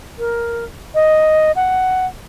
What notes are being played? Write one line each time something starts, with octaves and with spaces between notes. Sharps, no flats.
A#4
D#5
F#5